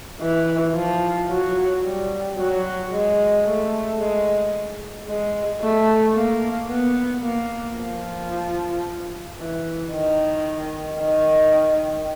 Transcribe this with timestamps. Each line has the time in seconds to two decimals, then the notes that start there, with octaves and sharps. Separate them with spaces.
0.21 E3
0.75 F3
1.30 F#3
1.84 G3
2.37 F#3
2.92 G#3
3.45 A3
3.99 G#3
5.08 G#3
5.62 A3
6.16 A#3
6.69 B3
7.22 A#3
7.77 F3
9.38 E3
9.93 D#3
11.00 D#3